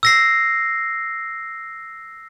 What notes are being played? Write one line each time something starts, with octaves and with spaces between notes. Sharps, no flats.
E6 A#6 C7